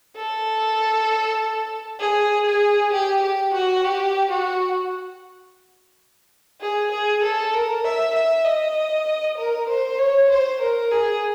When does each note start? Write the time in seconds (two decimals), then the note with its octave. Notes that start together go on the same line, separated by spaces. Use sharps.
0.16 A4
2.00 G#4
2.46 G#4
2.93 G4
3.23 G4
3.54 F#4
3.85 G4
4.30 F#4
6.61 G#4
6.91 G#4
7.23 A4
7.54 A#4
7.84 E5
8.15 E5
8.45 D#5
9.38 A#4
9.69 C5
9.99 C#5
10.30 C5
10.61 A#4
10.92 G#4